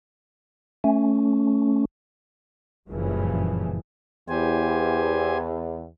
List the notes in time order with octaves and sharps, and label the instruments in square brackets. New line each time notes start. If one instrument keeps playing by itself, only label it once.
[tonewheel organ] A3 C#4
[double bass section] F#1 G2 A#2 C#3 E3 F3
[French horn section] E2 [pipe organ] G4 C5 G#5